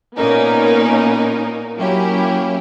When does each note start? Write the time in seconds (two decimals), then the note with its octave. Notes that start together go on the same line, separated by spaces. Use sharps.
0.17 A#2 A#3 B3 C#4 D#4 A#4
1.76 F#3 A#3 C#4 E4 G4